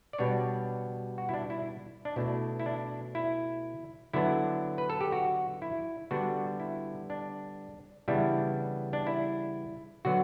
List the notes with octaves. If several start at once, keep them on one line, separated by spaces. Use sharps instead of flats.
D5
B2 G3 B3 D4 C#5
F#4
E4
D4
E4
D4
B2 A3 D4 E4
E4
D4
E4
D3 F#3 B3 D4 E4
B4
A4
G4
F#4
E4
D3 G3 B3 D4 F#4
E4
D4
C#3 E3 G3 B3 D4 E4
D4
E4
D3 F#3 B3 F#4